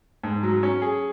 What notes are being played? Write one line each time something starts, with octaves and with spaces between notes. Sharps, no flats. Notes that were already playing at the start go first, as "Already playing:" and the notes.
G#2
F#3
C#4
G#4